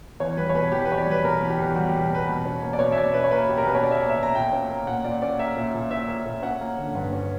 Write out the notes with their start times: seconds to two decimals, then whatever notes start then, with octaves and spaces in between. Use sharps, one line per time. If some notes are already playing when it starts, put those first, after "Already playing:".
0.20 E2 C#5
0.37 G3 B4
0.49 C#5
0.55 B2 B4
0.71 E2 G4
0.85 B4
0.89 E2 C#5
0.97 D5
1.07 G3 B4
1.24 B2 A#4
1.41 E2
1.50 G4
1.59 E2
1.75 G3 F#4
1.89 G4
1.93 B2
2.10 E2 B4
2.28 B2
2.45 C#4
2.63 A#3
2.73 D5
2.79 B2 C#5
2.92 E5
2.96 B2 D5
3.14 C#4 B4
3.24 C#5
3.31 A#3 B4
3.48 B2 G4
3.57 A#4
3.66 B2 B4
3.75 C#5
3.83 C#4 D5
3.91 E5
3.97 D5
4.01 A#3
4.09 E5
4.18 B2
4.23 A#5
4.35 A#2 G5
4.53 C#4
4.70 A#3
4.87 A#2 F#5
5.04 A#2 D5
5.22 C#4 D5
5.39 A#3 E5
5.57 A#2
5.74 A#2
5.91 C#4 E5
6.08 A#3
6.26 A#2
6.42 C#4 F#5
6.61 A#3
6.77 D3
6.95 G2
7.13 C#4